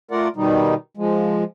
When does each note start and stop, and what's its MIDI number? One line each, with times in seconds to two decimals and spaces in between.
0.11 0.28 57
0.11 0.28 65
0.11 0.28 70
0.11 0.28 74
0.11 0.28 78
0.36 0.74 47
0.36 0.74 51
0.36 0.74 55
0.36 0.74 63
0.97 1.44 53
0.97 1.44 56